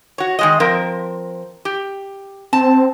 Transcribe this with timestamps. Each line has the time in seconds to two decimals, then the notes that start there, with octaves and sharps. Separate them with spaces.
0.18 F#4 C#5
0.39 D#3 G#3 D#5
0.60 F3 C4 A#4
1.65 G4
2.53 C4 A5